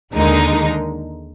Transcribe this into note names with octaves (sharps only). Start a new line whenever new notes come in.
D#2 D3 G#3 D#4 A#4